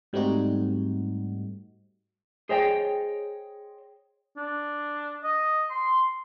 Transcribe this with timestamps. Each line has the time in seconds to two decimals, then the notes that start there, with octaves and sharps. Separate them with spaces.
0.13 G#2 G3 A3 C4 D#4 F#4
2.49 G#4 C5 C#5 D#5 G5
4.37 D4
5.24 D#5
5.71 C6